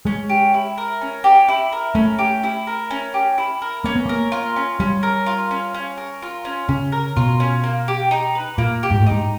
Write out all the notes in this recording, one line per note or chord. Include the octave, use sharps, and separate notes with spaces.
G#3 C#4
G4
E4
A#4
C#4
G4
E4
A#4
A3 C#4
G4
E4
A#4
C#4
G4
E4
A#4
A#3 C#4
B3
A#3 A#4
F4
C#4
G3 C#4
A#4
F4
C#4
C#4
A#4
F4
C#4
C#3 C#4
A#4
B2 F4
C#4
A#3
G4
D#4
B4
A#2 A#3
G4
G#2
A2
G#2 D#4